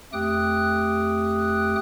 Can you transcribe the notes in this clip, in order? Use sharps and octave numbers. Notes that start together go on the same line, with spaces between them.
F2 A3 G4 G5 D#6 F#6